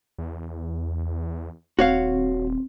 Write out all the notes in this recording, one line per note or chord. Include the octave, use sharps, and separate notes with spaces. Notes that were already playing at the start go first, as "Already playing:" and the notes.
E2
D#1 C4 F#4 C#5 F5